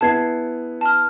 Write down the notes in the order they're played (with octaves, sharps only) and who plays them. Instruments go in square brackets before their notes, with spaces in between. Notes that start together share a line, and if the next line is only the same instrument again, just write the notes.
[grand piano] B3 E4 G#4 [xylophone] A5 G#6 C7
[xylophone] A5 F6